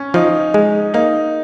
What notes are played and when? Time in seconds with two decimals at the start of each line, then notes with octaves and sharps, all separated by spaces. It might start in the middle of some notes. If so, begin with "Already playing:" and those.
Already playing: C#4
0.14 F3 D#4
0.54 G#3
0.94 A#3 D#4